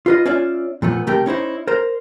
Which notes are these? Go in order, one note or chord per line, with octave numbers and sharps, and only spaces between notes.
F4 B4 D#5
C#4 F4 C#5 D5 E5
A#2 F3 A3 B3
C3 A3 G4 A#4 G5
C#4 D#4 E4 C5
A#4 C5